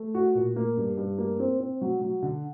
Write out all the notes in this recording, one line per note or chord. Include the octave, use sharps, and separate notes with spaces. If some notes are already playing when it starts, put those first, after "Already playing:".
Already playing: A3
F#4
A#2
A#3
G2
G2
A#3
C4
C4
F#3
F#3
D3